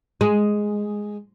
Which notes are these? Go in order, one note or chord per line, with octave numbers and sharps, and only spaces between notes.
G#3